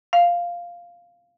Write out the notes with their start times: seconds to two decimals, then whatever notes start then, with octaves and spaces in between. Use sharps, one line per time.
0.13 F5